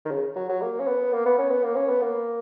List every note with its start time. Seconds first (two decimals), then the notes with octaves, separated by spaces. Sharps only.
0.06 D#3
0.11 C#3
0.36 F#3
0.49 F#3
0.62 A#3
0.80 C#4
0.87 B3
1.13 A#3
1.26 B3
1.38 C#4
1.51 B3
1.64 A#3
1.76 C#4
1.89 B3
2.02 A#3